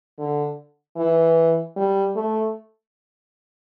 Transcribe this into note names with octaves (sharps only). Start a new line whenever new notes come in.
D3
E3
G3
A3